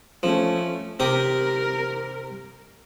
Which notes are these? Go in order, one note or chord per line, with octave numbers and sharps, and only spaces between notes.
F3 A3 C#4
C3 G4 A#4 D#6